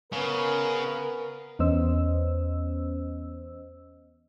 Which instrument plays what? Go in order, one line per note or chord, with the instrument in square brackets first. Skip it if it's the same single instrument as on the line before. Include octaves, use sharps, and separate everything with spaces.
[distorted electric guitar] C#3 [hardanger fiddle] B3 [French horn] A#4
[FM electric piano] E2 B3 C#4 C5 D#5 E6